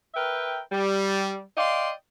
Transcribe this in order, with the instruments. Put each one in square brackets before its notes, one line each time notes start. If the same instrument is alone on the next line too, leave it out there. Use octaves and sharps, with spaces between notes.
[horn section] A#4 B4 E5 G5
G3
D5 D#5 F5 G5 C6